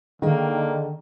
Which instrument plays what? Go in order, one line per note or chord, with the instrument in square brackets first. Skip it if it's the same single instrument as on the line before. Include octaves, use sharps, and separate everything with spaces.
[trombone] D3 [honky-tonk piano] D#3 [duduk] A#3 [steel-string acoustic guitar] G#4 D#5 G5